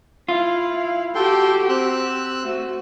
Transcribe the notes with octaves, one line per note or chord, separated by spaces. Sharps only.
E4 F4 F5
F#4 G4 A4 G5 C6
C4 E6 F#6
A3 F#4